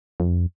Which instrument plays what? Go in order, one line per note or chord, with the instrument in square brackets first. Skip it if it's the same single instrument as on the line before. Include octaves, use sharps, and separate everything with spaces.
[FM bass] F2